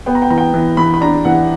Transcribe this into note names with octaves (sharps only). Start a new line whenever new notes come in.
B3 G5
A#5
G5
E3 A#5
G5
E3
E3 B5
B5
D4 A#5
E3 F#5